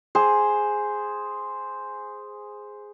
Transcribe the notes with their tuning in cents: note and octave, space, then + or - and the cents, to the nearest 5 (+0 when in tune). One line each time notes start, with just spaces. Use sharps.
G#4 +0 C5 +0